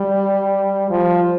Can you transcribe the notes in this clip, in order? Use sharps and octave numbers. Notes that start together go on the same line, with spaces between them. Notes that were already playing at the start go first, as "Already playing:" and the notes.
Already playing: G3
F3